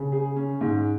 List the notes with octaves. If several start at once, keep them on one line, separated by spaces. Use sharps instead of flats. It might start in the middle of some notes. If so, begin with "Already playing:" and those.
Already playing: C#3
G#4
C#4
G#2